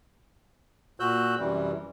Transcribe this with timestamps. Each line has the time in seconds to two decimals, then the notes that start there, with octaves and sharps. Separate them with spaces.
1.00 A#2 F#4 E6 F#6 G6
1.39 F#2 C3 E3 G3